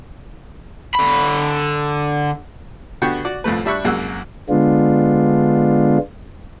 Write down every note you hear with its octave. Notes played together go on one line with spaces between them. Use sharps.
D3 B5
D3 B3 F#4 G4 G5 C#6
F#4 D5
C2 F2 A2 A3 B4
G3 D4 E5 B5 C#6 F#6
C2 F#2 G#3 A#3 F#5 E6
D3 G#3 B3 D4 F4